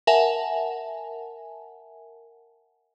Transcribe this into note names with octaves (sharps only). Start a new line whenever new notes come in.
A#4 E5 F#5 G#5 A5